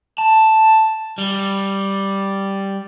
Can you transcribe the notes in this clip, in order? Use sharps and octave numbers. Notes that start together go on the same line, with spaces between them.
A5
G3